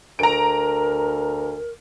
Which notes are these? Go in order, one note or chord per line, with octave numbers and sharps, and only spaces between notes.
D2 A#4 A#5 D7